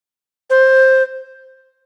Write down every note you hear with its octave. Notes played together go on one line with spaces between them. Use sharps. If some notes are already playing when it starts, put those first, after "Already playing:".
C5